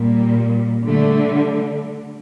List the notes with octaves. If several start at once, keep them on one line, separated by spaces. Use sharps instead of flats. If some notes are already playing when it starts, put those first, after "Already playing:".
Already playing: A#2 G3
D3 G3 A3